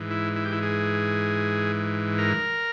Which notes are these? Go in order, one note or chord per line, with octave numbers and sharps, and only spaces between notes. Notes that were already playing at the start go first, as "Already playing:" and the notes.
Already playing: G#2 E3
E4
E4
G4
E4
G#4
A#4